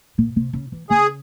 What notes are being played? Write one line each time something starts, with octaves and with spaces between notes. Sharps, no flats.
A#2
C3
C#3
E3
C#3 G#4